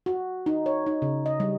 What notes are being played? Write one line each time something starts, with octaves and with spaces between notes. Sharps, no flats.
F#4
D#4
C#5
D#4
C#3
D#5
G3